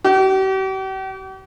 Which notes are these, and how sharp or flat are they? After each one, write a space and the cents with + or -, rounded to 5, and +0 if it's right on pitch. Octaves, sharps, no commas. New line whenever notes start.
G4 -45